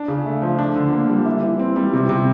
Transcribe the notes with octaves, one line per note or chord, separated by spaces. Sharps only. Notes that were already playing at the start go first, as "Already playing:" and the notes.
Already playing: D4
C#3
A3
F3
D4
D3
A#3
G3
E4
E3
C4
G3
C3
C3